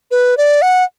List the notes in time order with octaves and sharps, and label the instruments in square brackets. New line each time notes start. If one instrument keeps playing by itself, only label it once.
[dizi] B4
D5
F#5